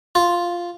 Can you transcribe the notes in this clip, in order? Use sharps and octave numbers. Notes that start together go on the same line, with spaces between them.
F4